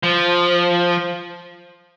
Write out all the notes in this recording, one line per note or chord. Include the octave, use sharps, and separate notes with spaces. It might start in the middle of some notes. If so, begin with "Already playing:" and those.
F3